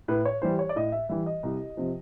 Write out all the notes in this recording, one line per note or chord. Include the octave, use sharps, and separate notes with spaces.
A2 B4
C#5
E3 G3 C5
C#5
D5
A2 D#5
E5
E3 G3 E5
D#5
C2
C3 F3